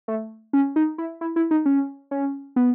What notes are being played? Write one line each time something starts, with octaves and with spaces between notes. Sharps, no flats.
A3
C#4
D#4
E4
E4
E4
D#4
C#4
C#4
B3